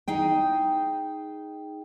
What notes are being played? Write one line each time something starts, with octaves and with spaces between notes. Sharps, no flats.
D#4 G#4 G5